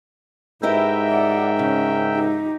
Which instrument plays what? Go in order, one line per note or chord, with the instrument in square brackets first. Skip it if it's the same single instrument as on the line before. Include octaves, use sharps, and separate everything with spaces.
[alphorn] G#2 [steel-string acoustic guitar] E4 G4 D#5 [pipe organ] A#4 E5 G5 [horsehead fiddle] B4
[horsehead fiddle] D5 F#5
[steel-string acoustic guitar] C#3 [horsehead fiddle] C#4
[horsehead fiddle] D#4 G4